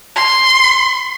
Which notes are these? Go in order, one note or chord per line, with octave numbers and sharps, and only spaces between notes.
C6